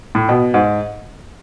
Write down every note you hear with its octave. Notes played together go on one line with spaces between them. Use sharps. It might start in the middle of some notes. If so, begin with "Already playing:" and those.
A2
B2
G#2